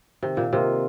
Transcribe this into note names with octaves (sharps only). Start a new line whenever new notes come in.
C3 D#3
A#2
C3 A#3 F4 A#4 D#5